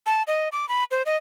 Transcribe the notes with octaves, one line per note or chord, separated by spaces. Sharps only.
A5
D#5
D6
B5
C5
D#5